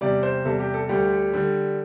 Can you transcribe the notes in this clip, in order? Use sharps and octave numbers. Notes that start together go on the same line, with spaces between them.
E2 C3 G3 D5
C5
E2 C3 G3 A4
G4
A4
D2 D3 G3 G4
D3 G3